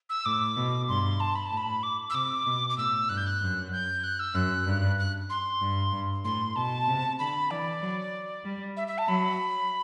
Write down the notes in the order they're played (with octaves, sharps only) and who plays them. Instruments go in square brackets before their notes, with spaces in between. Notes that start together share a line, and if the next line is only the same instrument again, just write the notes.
[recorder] E6
[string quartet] A2 [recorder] D6
[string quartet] B2
[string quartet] G2 [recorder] C6
[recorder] A5
B5
A5
[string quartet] A2
[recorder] B5
D6
E6
[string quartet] C3 [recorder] D6
[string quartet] B2
[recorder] D6
[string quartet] A2 [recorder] E6
[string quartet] G2 [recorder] F#6
[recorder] G6
F#6
[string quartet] F#2
[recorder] G6
F#6
E6
[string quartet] F#2 [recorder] F#6
[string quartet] G2
[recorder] F#6
C6
[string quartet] G2
G2
[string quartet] A2 [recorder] C6
[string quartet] B2 [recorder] A5
[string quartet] C3
[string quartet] D3 [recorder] B5
[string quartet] E3 [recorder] D5
[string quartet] F#3
G3
[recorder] E5
E5
A5
[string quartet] F#3 [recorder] B5